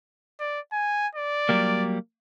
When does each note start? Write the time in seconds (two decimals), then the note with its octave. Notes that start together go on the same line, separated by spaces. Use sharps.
0.40 D5
0.73 G#5
1.15 D5
1.49 F#3 G3 A#3